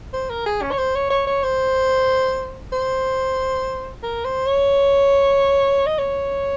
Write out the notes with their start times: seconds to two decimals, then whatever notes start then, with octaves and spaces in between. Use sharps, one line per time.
0.14 C5
0.30 A#4
0.46 G#4
0.62 C#4
0.71 C#5
0.78 C5
0.95 C#5
1.10 C#5
1.27 C#5
1.43 C5
2.73 C5
4.03 A#4
4.25 C5
4.47 C#5
5.86 D#5
5.98 C#5